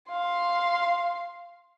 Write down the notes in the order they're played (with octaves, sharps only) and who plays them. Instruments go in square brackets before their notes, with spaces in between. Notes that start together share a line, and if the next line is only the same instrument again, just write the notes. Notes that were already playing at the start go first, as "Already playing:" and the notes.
[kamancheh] F5 C6